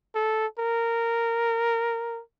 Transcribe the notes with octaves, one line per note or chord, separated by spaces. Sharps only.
A4
A#4